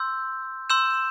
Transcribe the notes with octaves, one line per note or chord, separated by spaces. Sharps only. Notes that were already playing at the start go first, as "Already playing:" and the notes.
Already playing: C6 E6 G6
C6 E6 G6 E7